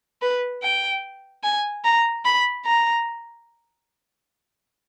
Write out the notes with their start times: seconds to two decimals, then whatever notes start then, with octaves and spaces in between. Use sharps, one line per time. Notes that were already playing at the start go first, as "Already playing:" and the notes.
0.22 B4
0.63 G5
1.44 G#5
1.84 A#5
2.25 B5
2.66 A#5